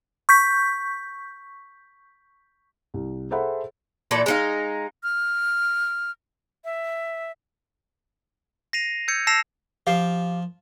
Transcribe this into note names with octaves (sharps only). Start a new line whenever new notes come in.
C#6 G6 B6
C2
G#4 A4 C5 E5 F#5 B5
A#2 E3 A4 D5
G#3 D#4 F5
F6
E5
A#6 C7 D#7 F7
E6 G6 G#6 C#7
A5 E6 A#6 C7 E7 F7
F3 G4 F5